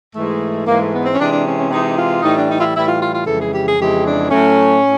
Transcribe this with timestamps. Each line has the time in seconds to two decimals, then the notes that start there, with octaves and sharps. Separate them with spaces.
0.14 G#2 E3 G#3 A3
0.67 G#2 E3 G#3 A#3
0.80 A3
0.92 B3
1.05 C4
1.13 C#4
1.18 C3 E3 G#3 D4
1.31 D4
1.45 C#4
1.57 C#4
1.70 C3 E3 G#3 D#4
1.96 F4
2.22 A2 E3 G3 D#4
2.36 D4
2.48 D#4
2.57 F4
2.60 E4
2.75 A2 E3 G3 E4
2.87 F4
3.00 F4
3.13 F4
3.25 F2 C#3 E3 G#3 A4
3.39 G#4
3.52 G4
3.65 G#4
3.78 F2 C#3 E3 G#3 G4
4.04 D4
4.29 A2 F#3 A3 C#4
4.82 A2